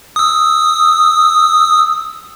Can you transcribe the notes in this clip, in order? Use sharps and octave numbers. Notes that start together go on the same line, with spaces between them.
D#6 E6